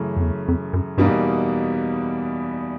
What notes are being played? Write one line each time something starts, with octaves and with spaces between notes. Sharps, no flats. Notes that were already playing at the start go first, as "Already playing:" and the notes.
Already playing: F#2 C#3 E3 A3
F2
E2
F2
F#2
E2 G2 B2 G3 A#3 D#4